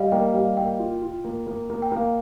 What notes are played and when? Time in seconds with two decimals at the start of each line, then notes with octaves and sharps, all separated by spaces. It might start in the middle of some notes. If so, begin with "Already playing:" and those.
Already playing: G3 D5 D#5 F5
0.12 A#3 G5
0.34 G3 F5
0.57 A#3 G5
0.79 F4
1.02 F4
1.25 A#3
1.47 A#3
1.70 A#3
1.82 G5
1.92 A#3 F5